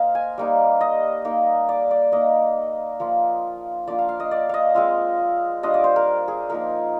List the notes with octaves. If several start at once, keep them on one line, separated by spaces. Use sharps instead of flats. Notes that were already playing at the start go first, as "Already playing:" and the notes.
Already playing: A#3 D#4 C5 D#5 F5
G#5
G3 A#3 D#4
D#5
A#3 D#4
D5
D5
A#3 D#4 D#5
F3 A#3 F4
F3 A#3 D4 F4 D5
F5
F5
D#5
D5
D#5 F5
G#3 C4 F4 F5
G3 D4 F4 D#5
D5
C5
A#4
G#4
F3 A#3 D#4 A#4